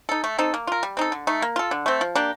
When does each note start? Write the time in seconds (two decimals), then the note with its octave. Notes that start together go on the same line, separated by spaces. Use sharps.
0.09 D#4 A4
0.24 A3
0.38 C4 D#4 A4
0.54 A#3
0.67 F4 A#4
0.83 G3
0.97 C4 D#4 A4
1.12 D3
1.27 A3 D#4
1.42 A#3
1.56 F4 A4
1.71 D3
1.86 A3 C4
2.01 F3
2.15 A#3 D4 G4